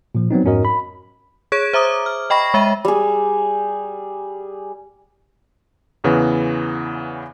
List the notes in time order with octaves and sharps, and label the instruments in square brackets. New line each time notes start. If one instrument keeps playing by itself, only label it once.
[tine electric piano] A#2 F3
F#3 B3 C4 D#4
F2 G#2 C#4 F#4 A#4 D#5
B5
[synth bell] G#4 C#5 G#6 D7
C5 E5 A#5 D6 D#6
F6
D#5 G5 B5 C#6 A#6
G#3 E5 B5 D#7
[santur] G3 G#4
[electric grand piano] E2 C#3 E3 B3